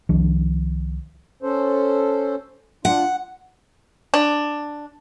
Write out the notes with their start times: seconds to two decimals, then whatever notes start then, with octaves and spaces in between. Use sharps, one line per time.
0.09 C2 D#3 F3 D4
1.43 C#4 A4 C5
2.85 D4 F4 F#5
4.14 D4